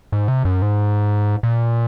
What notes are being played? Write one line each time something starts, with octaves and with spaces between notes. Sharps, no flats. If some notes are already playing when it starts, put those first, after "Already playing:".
G#2
C3
F#2
G#2
A#2